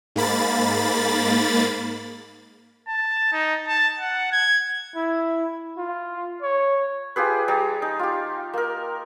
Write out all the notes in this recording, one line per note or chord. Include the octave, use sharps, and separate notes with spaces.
G#2 A#3 B5 A6
A5
D#4
A5
F#5
G#6
E4
F4
C#5
F4 G4 G#4 B4
G3 G#4 A#5
D#4
F4 G4
A#3 A#4